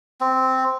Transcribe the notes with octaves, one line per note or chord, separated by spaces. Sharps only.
C4